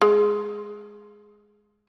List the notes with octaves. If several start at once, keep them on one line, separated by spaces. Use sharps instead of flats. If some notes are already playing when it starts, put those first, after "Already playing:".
G#3